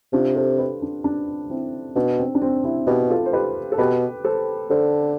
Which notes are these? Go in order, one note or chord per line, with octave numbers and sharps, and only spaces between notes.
C3 D4 F4
A4 C5
G4 B4
D4
D4
C4 E4
B2 D4
C4
D4
C4
C4 E4
B2 G4 B4
F4 A4
C5
G4 B4
A4
B2 G4 B4
A4 C5
D3 A4 C5